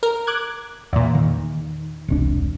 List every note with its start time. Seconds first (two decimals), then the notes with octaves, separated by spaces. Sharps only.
0.03 A#4
0.27 D6 F#6 G#6
0.93 E2 A#2
1.15 D#3
2.08 E1 C2 D4